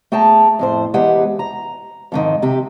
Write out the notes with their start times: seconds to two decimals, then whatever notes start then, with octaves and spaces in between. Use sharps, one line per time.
0.12 A3 G#4 G5 A5 A#5
0.59 F2 A2 C5
0.94 E2 G#3 G4 B4 F#5
1.39 A#5
2.12 F2 G#2 D#3
2.42 C3 G4